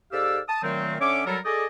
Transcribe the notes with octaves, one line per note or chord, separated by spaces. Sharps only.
G#2 G4 A4 D5 F5 E6
A5 D#6
A#2 D#3 F#3 A3 C4
D3 C#4 C#5 E5 D6
F#3 G3 A4 A#4
G#4 A4 D5 D#5